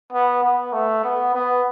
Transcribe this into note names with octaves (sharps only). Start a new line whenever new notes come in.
B3
B3
A3
B3
B3